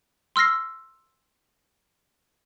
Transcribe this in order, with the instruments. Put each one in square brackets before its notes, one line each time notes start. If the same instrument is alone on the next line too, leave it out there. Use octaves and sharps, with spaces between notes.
[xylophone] C6 E6 F6 A#6 C7